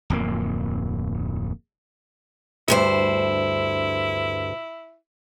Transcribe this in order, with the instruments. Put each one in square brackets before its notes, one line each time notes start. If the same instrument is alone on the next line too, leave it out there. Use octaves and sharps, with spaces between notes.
[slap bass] D1 F2 A#3
[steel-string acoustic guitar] D2 G2 C5 [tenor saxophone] E4